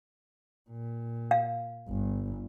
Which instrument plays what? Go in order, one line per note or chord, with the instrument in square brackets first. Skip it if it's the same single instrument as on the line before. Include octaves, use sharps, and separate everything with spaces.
[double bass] A#2
[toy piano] F5
[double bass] G1